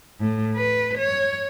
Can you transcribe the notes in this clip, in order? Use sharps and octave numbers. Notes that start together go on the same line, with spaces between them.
A2
B4
C#5